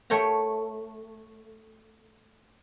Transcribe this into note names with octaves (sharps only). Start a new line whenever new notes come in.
A3 A#4 C#5 G5 A#5